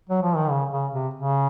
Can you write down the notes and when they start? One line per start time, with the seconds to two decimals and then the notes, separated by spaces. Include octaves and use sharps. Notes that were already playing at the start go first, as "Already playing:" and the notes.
0.10 F#3
0.22 F3
0.37 D#3
0.50 C#3
0.71 C#3
0.93 C3
1.14 C#3